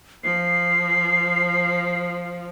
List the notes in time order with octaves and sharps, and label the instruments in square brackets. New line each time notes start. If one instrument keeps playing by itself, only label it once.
[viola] F3 [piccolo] C7